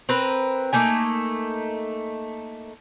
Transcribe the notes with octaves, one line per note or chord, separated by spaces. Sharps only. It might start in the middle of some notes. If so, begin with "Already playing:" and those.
C4 A#4 B4
A3 A#3 D#4 G#5